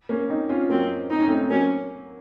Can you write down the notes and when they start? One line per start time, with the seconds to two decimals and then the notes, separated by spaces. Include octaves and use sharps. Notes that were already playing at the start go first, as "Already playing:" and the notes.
0.09 A#3 C#4
0.29 C4 D#4
0.49 C#4 F4
0.69 F#3 A#3 C4
1.10 C4 D#4
1.19 C#4
1.28 A3 C4
1.42 C4
1.50 F#3 A#3 C#4